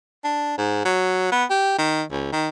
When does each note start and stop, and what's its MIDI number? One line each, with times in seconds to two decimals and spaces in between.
0.24 0.56 62
0.58 0.82 44
0.85 1.29 54
1.32 1.44 59
1.50 1.77 67
1.78 2.03 51
2.11 2.30 37
2.33 2.49 51